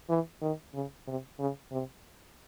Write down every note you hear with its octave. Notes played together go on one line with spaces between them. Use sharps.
E3
D#3
C#3
C3
C#3
C3